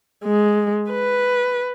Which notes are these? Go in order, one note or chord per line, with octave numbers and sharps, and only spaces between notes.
G#3
B4